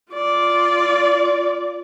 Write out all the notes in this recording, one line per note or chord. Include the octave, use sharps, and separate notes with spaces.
F4 D5